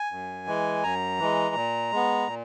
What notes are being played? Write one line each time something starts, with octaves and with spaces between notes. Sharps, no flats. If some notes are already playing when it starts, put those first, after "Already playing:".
Already playing: G#5
F#2
E3 G#3
F#2 A#5
E3 G#3
A#2
G#3 B3
A#2